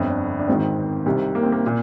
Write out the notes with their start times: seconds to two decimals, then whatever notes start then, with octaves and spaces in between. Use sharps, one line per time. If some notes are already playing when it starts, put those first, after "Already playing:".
Already playing: G1 F2 D3
0.10 D4
0.39 D4
0.48 G#1 G#2 D#3 C4
1.06 C2 C3 D#3
1.35 A#3
1.43 C4
1.52 A#3
1.66 A#2